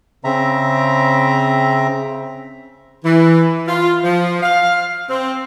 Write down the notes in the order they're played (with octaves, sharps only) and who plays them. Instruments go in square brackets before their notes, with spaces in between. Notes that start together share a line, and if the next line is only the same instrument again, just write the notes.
[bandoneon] C#3 C4 E5 A#5
[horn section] E3
F4
F3
F5
C4